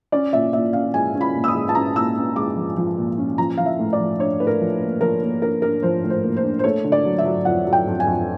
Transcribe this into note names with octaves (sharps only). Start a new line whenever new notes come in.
C#4 D5
A#2 E5
A#2 E5
C#4 F5
G#3 G#5
C#4
B5
A#2
E6
D#6
G#3
A5
C#4 A#5
A#2 E6
C#4
G#3 D6
F3
F3
A#2
C#4
F3 A#5
F3 F5
E5
A2
D5
F3
D4 C#5
A2 B4
A#4
F3
A#3
F3 A#4
A#3
D4 A#4
D4 A#4
F3 C5
A2
C5
A#3
C5
D4
C5
A3 C#5
D3
D5
F#3
E5
F#3
F2 F#5
F#3
G5
F2
G#5
F2